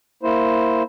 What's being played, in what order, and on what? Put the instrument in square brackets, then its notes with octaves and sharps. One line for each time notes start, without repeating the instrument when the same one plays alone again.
[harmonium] A#3 E4 C5